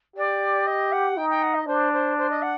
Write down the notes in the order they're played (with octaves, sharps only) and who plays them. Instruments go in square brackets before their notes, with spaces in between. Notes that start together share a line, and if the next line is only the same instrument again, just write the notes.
[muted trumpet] G4 [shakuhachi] D5
[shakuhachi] D#5
F#5
[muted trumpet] D#4 [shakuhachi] G5
[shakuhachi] G5
F#5
D#5
[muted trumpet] D4 [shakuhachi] C5
[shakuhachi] C5
C5
D#5
F#5